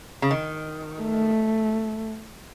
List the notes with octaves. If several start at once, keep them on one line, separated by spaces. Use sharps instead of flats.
C#3
D#3
A3